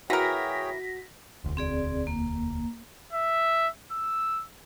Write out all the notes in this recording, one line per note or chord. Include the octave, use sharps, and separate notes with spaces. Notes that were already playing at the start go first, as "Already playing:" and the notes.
E3 F#4 G#4 A#4 C#5 G5 A#6 B6
E1 D2
C4 G#4 D5
A#3
E5
E6